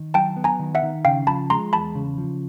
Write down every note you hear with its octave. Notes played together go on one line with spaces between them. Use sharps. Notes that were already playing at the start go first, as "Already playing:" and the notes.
Already playing: D#3
F#3 G5 A5
B3
G#5 A#5
D#3
E5 F#5
D#3
C#3 F5 G5
F3 A5 B5
G#3 A#5 C6
E2 A5 B5
C#3
F3